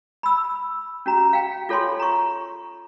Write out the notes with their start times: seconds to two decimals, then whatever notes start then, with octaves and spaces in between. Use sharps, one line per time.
0.23 B5 E6
1.06 C#4 F#4 A#5
1.33 F5 G5
1.69 F4 A4 C#5 G#5 C6
2.00 A#5 C#6